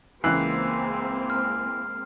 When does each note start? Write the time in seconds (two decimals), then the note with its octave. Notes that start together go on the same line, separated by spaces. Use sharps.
0.24 C#2 E3 G#3 A#3 C4 F#6 C7
1.30 F6